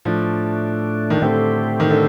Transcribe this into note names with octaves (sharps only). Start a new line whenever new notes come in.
A2 F3 A3 D4
D#3
A2 D3 A3 C4 G4
D#3
D3